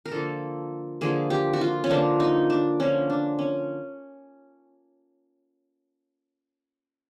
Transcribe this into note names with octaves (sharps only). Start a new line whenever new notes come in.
A#4
D3 F3 A#3 A4
D3 F3 A#3 G#4
G4
F#4
F4
C#4
D3 F3 A#3 D4
D#4
D4
D3 F3 A#3 C#4
D4
C#4